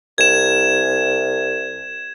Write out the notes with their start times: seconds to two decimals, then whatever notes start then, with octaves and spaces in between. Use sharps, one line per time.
0.18 C2 G#6 E7